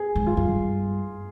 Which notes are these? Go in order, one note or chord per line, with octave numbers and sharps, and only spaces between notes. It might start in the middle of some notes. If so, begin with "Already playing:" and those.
Already playing: G#4
G#2
F4
G2